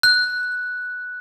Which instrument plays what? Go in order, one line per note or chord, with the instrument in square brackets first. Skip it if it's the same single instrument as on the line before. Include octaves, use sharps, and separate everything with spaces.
[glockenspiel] F#6